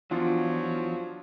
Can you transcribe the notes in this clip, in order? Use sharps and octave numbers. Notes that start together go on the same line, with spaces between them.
E2 F3 F#3 D4 F4